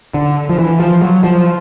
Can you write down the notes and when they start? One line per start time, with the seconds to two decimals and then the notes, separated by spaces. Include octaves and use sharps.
0.14 D3
0.49 F3
0.58 E3
0.80 F3
1.02 F#3
1.24 F3